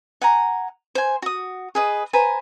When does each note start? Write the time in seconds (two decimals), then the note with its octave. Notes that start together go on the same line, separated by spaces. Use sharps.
0.21 F#5 G#5 A#5
0.95 C5 G#5
1.22 F#4 D#6
1.75 G#4 B4 D#5
2.13 B4 C5 G#5 A#5